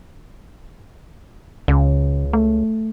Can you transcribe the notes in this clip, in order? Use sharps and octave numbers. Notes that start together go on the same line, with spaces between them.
C#2 C#3
A3